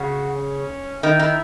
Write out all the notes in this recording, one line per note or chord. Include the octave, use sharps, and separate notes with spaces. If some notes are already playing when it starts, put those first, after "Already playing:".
Already playing: C#3 F#4
C#4
D#3 E4
D#3